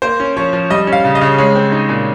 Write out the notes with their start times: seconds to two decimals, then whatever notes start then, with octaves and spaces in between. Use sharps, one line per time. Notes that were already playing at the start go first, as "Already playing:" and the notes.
0.02 A#3 C5
0.20 C#4
0.36 F3 C#5
0.53 F3
0.70 G3 D#5
0.87 C#4
0.93 F5
1.05 C#3
1.15 D#5
1.21 C#3
1.38 G#3 C#5
1.55 C4
1.72 D#4
1.89 A#2